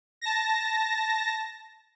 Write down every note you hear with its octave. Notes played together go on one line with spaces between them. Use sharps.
A5 A#6